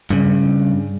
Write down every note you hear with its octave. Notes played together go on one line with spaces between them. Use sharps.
G2 C#3